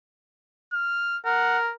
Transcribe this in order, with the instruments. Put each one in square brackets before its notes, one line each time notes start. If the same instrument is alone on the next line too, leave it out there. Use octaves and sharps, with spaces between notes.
[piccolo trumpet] F6
[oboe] A#4 [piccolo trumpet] F#5